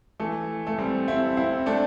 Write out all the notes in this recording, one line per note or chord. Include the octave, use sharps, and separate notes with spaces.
E3 A3
A3
G3 C4
C4 E4
C4 E4
A3 D4